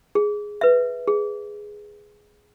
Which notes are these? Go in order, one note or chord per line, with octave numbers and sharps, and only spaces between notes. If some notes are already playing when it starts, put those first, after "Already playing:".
G#4
B4 E5
G#4